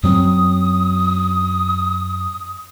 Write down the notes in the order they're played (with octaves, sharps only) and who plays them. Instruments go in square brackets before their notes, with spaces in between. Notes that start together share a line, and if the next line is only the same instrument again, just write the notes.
[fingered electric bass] F#2 F#3 C4 [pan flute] D#6